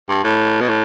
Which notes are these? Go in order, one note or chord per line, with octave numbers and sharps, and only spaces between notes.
G2
A2
B2
A2